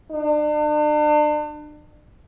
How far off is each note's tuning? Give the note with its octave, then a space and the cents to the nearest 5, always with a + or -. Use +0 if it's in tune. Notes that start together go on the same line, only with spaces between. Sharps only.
D4 +35